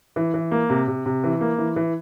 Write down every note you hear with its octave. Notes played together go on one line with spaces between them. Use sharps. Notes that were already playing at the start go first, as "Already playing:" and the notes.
E3
E3
A#3
C3
C3
C3
E3
A#3
E3
E3